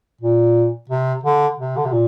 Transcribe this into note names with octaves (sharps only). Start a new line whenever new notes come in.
A#2
C3
D3
C3
D3
C3
A#2